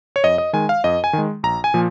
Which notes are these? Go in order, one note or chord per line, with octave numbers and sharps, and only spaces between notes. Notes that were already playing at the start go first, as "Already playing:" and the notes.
C#5
F2 D#5
D#5
D#3 G#3 G#5
F5
F2 D#5
G#5
D#3
G#3
A#1 A#5
G#5
A#2 F3